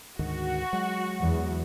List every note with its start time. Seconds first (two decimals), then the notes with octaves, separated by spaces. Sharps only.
0.19 D2 G#2 D#3 F#4
0.73 F#3 G#3
1.19 E2